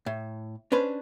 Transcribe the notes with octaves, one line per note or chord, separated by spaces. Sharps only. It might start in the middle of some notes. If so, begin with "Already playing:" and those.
A2
C#4 D4 B4 C5